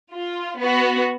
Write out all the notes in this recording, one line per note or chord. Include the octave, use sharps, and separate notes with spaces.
F4
B3 F#4